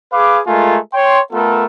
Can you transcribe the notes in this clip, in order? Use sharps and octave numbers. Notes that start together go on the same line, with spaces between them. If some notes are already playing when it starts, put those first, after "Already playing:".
G#4 B4 F5 D6
G#3 A3 F4 A#4 G#5
C#5 G5 C6
A3 B3 F4 A4 A#4